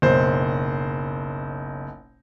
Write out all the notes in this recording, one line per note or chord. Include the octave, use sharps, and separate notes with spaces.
F#1 B1 C5